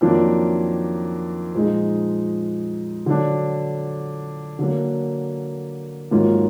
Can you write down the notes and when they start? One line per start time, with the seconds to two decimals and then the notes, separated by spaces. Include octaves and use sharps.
0.01 F2 D#3 F#3 A#3 D4
1.53 A#2 F3 G#3 D#4
3.06 D3 F#3 D4
4.59 D3 F#3 A#3
6.11 G#2 D#3 F#3 A#3 F4